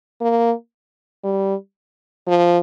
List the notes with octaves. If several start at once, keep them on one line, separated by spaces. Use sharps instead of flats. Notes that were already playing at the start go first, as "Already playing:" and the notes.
A#3
G3
F3